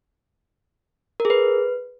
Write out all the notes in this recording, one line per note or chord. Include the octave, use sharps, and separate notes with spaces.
A#4
G#4
B4